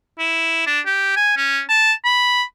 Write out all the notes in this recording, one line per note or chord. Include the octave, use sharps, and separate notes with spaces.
E4
D4
G4
G#5
C#4
A5
B5